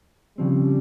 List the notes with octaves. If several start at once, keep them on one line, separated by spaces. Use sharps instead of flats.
C#3 F3 G3 C4